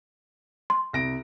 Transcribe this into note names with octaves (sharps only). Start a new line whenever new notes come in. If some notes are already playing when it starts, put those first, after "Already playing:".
C6
C2 A#6 D7